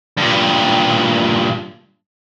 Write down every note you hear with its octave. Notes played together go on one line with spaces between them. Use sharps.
G2 A#2